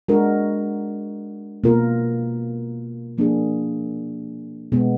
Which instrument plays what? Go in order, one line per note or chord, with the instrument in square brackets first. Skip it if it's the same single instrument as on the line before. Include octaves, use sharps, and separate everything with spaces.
[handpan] G#3 D4 F#4 A#4
B2 A#3 F4 A#4
F3 A#3 D4 G#4
B2 G#3 B3